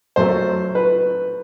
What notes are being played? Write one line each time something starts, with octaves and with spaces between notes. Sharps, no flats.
F#2 F#3 A3 C5
B4